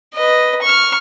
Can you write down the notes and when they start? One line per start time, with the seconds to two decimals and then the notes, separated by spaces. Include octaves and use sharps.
0.15 B4 D#5
0.62 C#6 F6